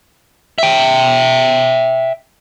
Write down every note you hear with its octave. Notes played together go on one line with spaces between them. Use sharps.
E5 G5